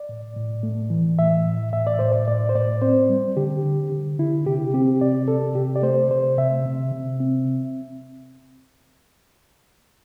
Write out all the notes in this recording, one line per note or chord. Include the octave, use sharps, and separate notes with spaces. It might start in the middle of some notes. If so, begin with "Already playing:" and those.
Already playing: D5
A2
A2
A3
E3
A2 E5
A2
A2 E5
D5
A2 C5
D5
A2 D5
C5
A2 D5
C4 C5
G3
D3 G4
D3
D3
D3 E4
C3 G4
C4 G4
C3 D5
C3 A4
C3 G4
D5
A3 C5
C3 C5
C3 E5
C3
C3
C4